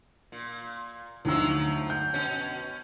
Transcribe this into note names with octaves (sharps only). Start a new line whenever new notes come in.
A#2
D2 F3 F#3 D#4 E6
G6
B2 C#4